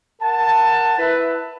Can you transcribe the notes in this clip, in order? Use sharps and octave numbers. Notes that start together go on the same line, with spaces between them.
A#4 F#5 A5
E4 B4